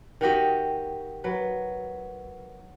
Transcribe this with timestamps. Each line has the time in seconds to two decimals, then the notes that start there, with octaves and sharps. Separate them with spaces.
0.21 D#3 F#4 G4 D#5
1.24 F#3 B4